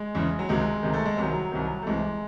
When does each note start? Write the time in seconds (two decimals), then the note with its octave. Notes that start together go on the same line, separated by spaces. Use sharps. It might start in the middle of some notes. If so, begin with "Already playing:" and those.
Already playing: G#3
0.15 E2 C#3 E3
0.39 F#3
0.49 C#2 C3 D#3 G#3
0.83 C#2 C3 D#3
0.93 A3
1.05 G#3
1.17 C2 C3 D#3 F#3
1.52 C2 C3 D#3
1.82 A3
1.86 C2 C3 E3 G#3